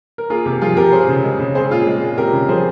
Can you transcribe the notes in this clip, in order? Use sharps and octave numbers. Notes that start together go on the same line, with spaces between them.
A#4
A#3 F4 G#4
C3
F3 F4 G#4
C3 G4 A#4
C4 G#4 C5
C#3
G#3
C#3
C4 G#4 C5
A#2 F4 G#4
G#3
A#2
C4 G4 A#4
C#3
F3 G#4 C5